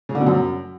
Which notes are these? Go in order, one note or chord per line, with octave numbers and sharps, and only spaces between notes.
C#3
D3
B2
F#2